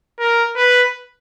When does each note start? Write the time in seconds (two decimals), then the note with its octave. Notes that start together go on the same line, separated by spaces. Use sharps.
0.19 A#4
0.56 B4